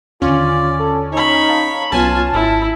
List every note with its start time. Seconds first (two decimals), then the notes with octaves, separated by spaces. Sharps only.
0.22 D#2 D3 C#4 F4 D5
0.79 A4
1.12 D#4 C#5 B5
1.48 F5 A5 A#5
1.92 C2 F#3 B3 C#4 F4 G#5 A5
2.33 G#1 E4